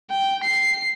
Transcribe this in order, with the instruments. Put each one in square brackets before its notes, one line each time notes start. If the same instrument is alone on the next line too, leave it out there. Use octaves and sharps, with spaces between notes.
[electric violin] G5
C7